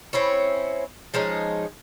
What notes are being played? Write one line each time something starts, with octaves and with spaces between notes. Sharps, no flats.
C4 C#4 E4 C#5
F3 G#3 C#4 D#4